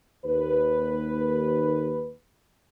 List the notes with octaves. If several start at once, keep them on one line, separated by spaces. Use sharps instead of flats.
D#2 B4